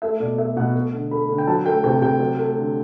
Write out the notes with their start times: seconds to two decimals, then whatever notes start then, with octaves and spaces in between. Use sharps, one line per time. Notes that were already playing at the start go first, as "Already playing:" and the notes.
0.02 A3 E5
0.20 B2 D5
0.38 A3 E5
0.56 B2 F#5
0.75 A3
0.93 D3
1.11 A3 B5
1.29 D3
1.38 G5
1.47 F#3 A5
1.66 A3 G5
1.84 C3 G5
2.02 C3 G5
2.20 F#3
2.38 A3
2.56 D3